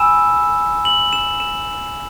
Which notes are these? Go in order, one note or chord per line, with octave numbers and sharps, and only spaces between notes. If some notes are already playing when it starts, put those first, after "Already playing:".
Already playing: G#5 B5 E6 E7
F#7
E7
E7